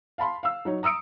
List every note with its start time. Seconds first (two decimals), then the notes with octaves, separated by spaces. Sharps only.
0.18 F5 A5 B5 C6
0.43 F5 E6
0.65 F#3 D#4 C#5
0.83 A#5 D#6 E6 C#7 D7